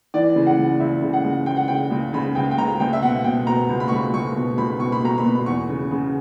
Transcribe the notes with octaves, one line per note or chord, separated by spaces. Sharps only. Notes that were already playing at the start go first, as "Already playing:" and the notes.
E3 D5
C#3
F#5
C#2
C#2 E5
C#3
F#5
C#2
C#3 G5
F#5
C#3 G5
C#2
C#3 B5
C#2 G5
G5
C#2 A#5
C#2 G5
E5
B2 F#5
B2 G5
B2 A#5
C#2
B5
C#6
C#2 B5
C#2 C#6
B2
C#2 B5
B2 C#6
B5
B2 A#5
B5
B2
B5
E2 C#6
C#3
C#3